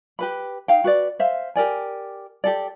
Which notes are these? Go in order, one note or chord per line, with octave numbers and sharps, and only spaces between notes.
G4 B4 B5
D#4 F5 G5
F#4 B4 D5
C5 E5 F5
G4 A#4 D5 G#5
G4 A4 D5